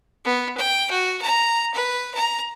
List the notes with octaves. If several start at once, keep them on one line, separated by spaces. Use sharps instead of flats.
B3
G5
F#4
A#5
B4
A#5